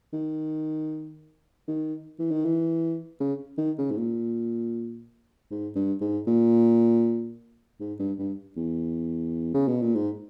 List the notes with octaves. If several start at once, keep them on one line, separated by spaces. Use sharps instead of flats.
D#3
D#3
E3
D#3
E3
C#3
D#3
C#3
G#2
A#2
G#2
G2
G#2
A#2
G#2
G2
G2
E2
C#3
B2
A#2
G#2